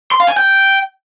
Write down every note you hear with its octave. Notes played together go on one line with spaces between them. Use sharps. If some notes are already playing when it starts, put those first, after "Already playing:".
C6
F5
G#5
G5